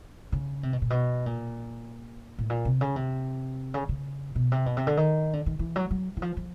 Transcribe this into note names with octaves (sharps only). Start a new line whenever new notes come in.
C#3
C3
B2
A#2
B2
A#2
A2
A#2
C3
C#3
C3
C#3
C#3
B2
C3
B2
C3
D3
D#3
D3
D#3
E3
F#3
F#3
E3
F3
F3